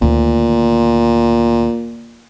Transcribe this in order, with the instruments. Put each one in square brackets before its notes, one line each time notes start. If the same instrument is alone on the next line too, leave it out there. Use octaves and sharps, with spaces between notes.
[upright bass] D2 D#3 [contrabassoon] A#2